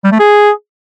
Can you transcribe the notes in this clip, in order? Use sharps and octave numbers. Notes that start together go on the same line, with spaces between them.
G3
A3
G#4